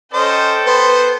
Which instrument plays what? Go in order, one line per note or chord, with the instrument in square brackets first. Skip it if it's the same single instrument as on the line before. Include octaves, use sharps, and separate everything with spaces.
[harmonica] C#4 C5 D#5 [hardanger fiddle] A4 G5
[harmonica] B3 C5 [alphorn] B4